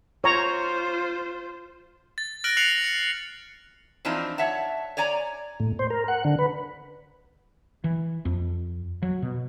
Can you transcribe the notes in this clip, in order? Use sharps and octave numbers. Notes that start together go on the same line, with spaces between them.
F4 C5 C#5 A#5
A6
F6 F#6 A#6 D7 F#7
F#6 C7 C#7 F7 F#7
C#7
E3 F3 C4 D4 D#4
C#5 E5 F#5 A5
C#5 D5 G#5 A#5
A2
C5
A#4
F#5
D3
B4
E3
F2
F#3
B2